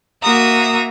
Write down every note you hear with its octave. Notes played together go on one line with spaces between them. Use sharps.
A#3 F#4 E5 A#5 D#6